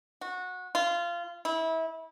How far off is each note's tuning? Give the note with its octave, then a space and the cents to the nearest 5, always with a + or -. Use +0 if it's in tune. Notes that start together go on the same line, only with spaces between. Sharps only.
F#4 -20
F4 -20
E4 -25